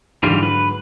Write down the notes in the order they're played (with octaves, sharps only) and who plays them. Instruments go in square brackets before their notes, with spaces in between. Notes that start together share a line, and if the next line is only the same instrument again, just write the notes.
[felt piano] G#2 D3 F#3 [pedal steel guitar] E3 G3 F4
[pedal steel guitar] B4